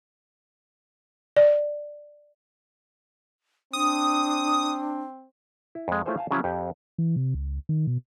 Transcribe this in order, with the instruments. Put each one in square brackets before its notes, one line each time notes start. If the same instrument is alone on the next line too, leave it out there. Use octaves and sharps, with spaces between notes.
[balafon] D5
[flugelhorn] C4 [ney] D4 [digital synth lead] D#6
[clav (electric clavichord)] E4
F2 G#3
A3 E4 F4 G#4 C5 C#5
F5 G#5 A5
C#3 F3 F#3 C#4 E4
F2 G4
[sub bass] E3
C3
C#2
D#3
B2